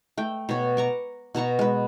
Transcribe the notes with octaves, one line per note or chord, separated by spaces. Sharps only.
A3 G5
B2 C#5
A#5 C#6 D6
B2 A5 A#5 C#6
G#3 B4